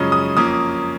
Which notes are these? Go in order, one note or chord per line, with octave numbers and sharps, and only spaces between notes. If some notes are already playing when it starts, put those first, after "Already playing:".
Already playing: F#2 C#3 F3 G#3 C#4 D#6
D#6
F2 F3 A#3 C#4 D#6